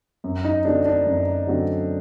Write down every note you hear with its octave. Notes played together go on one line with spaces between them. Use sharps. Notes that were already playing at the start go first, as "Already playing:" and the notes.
F#2
D#4
D3 F#3 A3 C4 D4
D4
F#2
D3 F#3 A3 C4